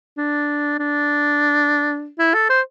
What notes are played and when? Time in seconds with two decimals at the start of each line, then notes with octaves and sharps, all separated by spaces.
0.17 D4
0.79 D4
2.19 E4
2.34 A4
2.50 C5